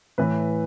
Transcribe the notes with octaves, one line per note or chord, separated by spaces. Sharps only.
A2 E3 B4